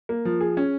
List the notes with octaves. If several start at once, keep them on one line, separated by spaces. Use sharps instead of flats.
A#3
F3
G#4
C#4